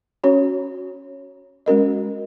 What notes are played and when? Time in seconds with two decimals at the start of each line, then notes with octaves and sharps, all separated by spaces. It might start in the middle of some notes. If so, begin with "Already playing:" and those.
0.24 C#4 F#4 C#5
1.66 G#3 C#4 F#4 A#4 D#5